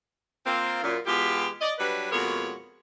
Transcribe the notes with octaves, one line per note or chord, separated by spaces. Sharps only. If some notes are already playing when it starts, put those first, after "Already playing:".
A#3 C4 F4
F#2 A#2
B2 E3 G#3 F4 G4
D5 D#5
F#3 G3 D4 B4
F2 B2 G#3 A#3 F#4 C#5